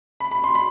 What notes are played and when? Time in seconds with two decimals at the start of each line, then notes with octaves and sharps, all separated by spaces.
0.20 B5
0.31 B5
0.44 C6
0.55 B5